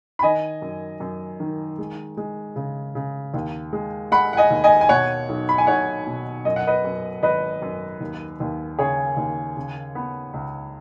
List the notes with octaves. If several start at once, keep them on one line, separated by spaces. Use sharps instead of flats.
B5
D#3 D#5 G#5
F#2
F#2
D#3
G#3
G#3
C#3
C#3
D#2
G#3
G#3 F#5 B5
F#5
D#5 G#5
D#2
D#5 G#5
G#5
B2 C#5 F#5
B1
B5
G#5
B1 C#5 F#5
B2
F#2 D#5
F#5
B4 D#5
F#2
G#1 B4 D#5
F#2
D#2
D#2
C#3 G#4 C#5
D#2
C#3
B3
C#2